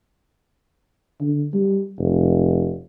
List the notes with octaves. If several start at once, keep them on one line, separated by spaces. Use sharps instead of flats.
D3
G3
F1